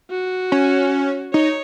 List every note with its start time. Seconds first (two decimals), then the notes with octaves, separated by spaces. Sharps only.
0.11 F#4
0.52 C#4
1.33 D#4 C#5